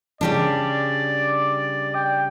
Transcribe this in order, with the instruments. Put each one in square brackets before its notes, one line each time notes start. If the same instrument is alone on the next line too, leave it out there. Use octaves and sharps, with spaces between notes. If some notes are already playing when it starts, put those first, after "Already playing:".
[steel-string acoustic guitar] C#3 G3 D4 [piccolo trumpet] D5
[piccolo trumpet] G5